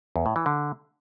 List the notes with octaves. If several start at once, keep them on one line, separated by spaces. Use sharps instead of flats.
E2
A2
E3
D3